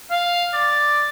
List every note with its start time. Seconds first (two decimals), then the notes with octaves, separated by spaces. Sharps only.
0.10 F5
0.54 D5